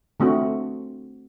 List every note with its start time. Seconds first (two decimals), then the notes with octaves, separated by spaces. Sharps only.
0.20 D3 A3 C4 F#4